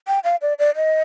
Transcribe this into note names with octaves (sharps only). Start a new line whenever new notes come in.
G5
F5
D5
D5
D#5